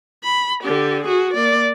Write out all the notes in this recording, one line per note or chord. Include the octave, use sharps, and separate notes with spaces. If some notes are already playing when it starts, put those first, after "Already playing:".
B5
D3 G4
F#4 G#4
A#3 D5